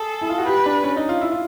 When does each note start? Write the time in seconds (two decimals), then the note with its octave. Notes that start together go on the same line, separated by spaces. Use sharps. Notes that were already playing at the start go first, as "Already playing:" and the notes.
Already playing: G#4 A4
0.21 E4
0.29 F4
0.38 F#4
0.47 G4 B4
0.66 D4
0.84 C#4
0.96 D#4
1.09 F4
1.21 E4
1.32 F4